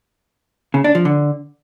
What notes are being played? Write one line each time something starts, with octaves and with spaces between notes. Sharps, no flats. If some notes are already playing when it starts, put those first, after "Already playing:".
C#3
D4
F3
D3